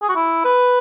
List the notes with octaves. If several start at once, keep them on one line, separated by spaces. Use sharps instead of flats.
G#4
F#4
E4
B4